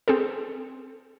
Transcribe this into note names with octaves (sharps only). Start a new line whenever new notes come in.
C4 G#4 A4